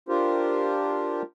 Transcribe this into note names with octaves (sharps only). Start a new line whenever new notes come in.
D4 F4 G4 A#4 C5